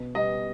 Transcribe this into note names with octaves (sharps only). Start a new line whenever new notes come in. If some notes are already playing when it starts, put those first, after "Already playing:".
Already playing: B2
G3 B3 D#5